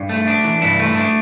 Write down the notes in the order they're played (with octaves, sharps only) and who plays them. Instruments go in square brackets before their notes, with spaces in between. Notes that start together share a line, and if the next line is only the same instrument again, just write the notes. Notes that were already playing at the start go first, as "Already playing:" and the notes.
Already playing: [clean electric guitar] G2
A3
D4
E3
G2 E4
A3
D4